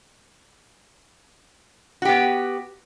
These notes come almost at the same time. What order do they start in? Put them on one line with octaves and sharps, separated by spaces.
F#4 G4 B3